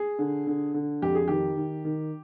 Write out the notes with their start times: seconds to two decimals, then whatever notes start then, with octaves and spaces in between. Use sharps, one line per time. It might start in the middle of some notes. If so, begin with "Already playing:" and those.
Already playing: G#4
0.19 D3
0.47 D3
0.74 D3
1.02 F2 G4
1.15 G#4
1.28 D#3 G4
1.57 D#3
1.85 D#3